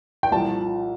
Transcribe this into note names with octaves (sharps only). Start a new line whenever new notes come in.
G5
C2 A#2 F3 A5